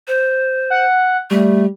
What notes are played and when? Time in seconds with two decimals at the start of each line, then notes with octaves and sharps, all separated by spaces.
0.08 C5
0.70 F#5
1.31 G3 A3